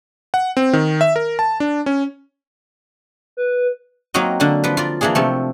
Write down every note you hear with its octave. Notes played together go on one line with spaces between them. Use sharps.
F#5
C4
D#3
E5
A#4
A5
D4
C#4
B4
F#3 A#3 C4 D#4 F#4 D#5
D3 A#3 D4
F3 B4
F4 A#4 D5
E3 F3 A#3 D4 G#4
C3 F3 A3